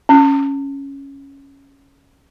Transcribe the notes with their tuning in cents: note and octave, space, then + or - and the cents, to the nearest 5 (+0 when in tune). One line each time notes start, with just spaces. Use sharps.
C#4 -5